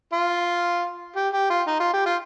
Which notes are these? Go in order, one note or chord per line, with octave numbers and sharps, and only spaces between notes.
F4
G4
G4
F4
D#4
F4
G4
F4